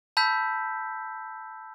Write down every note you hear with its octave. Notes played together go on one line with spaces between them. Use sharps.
A5 B5 E6 G6 B6